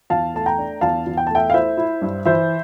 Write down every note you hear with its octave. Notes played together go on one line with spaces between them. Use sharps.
E2 F5 A5
A3 A5
G5 A#5
D4
E2 F5 A5
E2
G5
A3 A5
E5 G5
F5
E4 C5 E5
E4
G2
E3 C5 E5